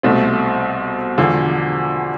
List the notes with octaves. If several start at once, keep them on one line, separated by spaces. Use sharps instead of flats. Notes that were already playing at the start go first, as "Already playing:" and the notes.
C2 B2 A3 C4
E1 E2 D3 F3